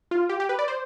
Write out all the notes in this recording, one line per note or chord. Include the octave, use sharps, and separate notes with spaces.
F4
G4
G4
B4
D5
C5